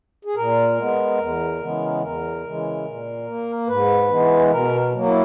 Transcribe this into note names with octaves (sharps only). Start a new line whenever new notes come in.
G#4
A#2 A#4
G#3 B3
E2
C#3 E3 G#3 B3
E2 A#4
C#3 E3 G#3
A#2
A#3
G#2 B4
E3 G#3 B3
B2 A#4
F#3 A#3
E4